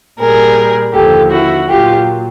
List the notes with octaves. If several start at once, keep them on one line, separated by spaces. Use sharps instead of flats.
A#2 G3 G#4 A#4
D#2 D3 F3 G4 A4
E4 F#4
A#2 F#3 F4 G4